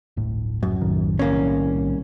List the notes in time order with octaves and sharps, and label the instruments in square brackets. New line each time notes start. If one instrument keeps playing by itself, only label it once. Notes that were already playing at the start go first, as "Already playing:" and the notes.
[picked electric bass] D1 G1 A2
[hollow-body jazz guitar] F#2
[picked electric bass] B1 A2 D#3
[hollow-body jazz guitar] C2 A#3 C#4